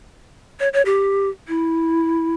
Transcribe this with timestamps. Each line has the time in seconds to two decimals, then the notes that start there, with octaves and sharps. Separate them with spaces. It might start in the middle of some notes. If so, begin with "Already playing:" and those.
0.60 C#5
0.73 C#5
0.86 G4
1.48 E4